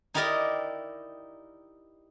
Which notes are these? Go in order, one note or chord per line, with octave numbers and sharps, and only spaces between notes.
D#4 E4 G4 A#4 D5 D#5